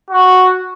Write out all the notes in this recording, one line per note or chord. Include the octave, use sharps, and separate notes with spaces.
F#4